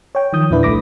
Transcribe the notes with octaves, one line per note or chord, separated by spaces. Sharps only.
C#5 G5
D#3 F3 D#6 G6
E2 A#2 D4 E4 B4 D5
C2 A3 B5 D6 A#6